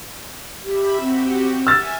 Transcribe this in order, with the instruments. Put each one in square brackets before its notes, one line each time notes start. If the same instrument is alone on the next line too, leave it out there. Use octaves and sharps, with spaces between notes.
[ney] G4 [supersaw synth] E5 B5
[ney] C4 [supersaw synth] F#4 G4
[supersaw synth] E5 G#5 [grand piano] E6 F6 A6